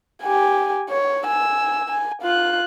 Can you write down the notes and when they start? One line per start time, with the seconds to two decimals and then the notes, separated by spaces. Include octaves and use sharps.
0.23 G4 G#5
0.90 C#5
1.26 G#5 E6
1.89 G#5
2.22 F4 F#6